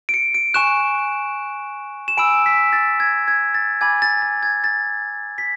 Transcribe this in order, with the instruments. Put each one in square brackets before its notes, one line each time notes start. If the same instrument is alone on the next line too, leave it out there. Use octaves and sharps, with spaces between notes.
[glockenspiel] D7
C#7
D7
G#5 C#6 F#6 E7
E7
G#5 B5 E6 D7
B6
A6
G#6
G#6
A6
G#5 B5 D6 G#6
A6
A6
G#6
A6
B6